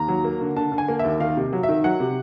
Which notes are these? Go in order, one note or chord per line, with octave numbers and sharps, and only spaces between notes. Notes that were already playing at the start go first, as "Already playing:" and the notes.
Already playing: D#2 A#5
F#3
A#3
D3
D3 A5
D3
G#5
A#3
D#2 E5
D#3 F5
C3
F#3
E5
D#3
F#3 F#5
C3